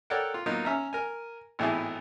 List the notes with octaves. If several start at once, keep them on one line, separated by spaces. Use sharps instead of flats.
A4 A#4 C#5 D5 F#5 G5
F4
F#3 A#3 B3 D#4 F4
C#4 E5 A#5 F6
A#4 G#5
G#1 A2 E3 B3 E4 G#4